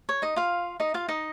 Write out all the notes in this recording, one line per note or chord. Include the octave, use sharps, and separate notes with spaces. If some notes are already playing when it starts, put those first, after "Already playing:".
C#5
D#4 D#5
F4 F5
D#4 D#5
F4 F5
D#4 D#5